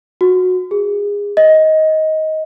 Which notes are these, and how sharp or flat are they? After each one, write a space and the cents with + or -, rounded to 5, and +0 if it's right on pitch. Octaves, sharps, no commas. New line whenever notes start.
F#4 -15
G#4 -25
D#5 +15